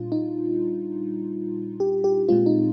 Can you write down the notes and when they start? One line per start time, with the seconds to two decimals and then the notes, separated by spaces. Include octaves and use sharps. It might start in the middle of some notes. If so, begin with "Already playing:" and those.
Already playing: A#2 G3 D4 F4
0.12 D#4
1.80 G4
2.04 G4
2.28 A#2 G#3 C4 F4
2.46 D#4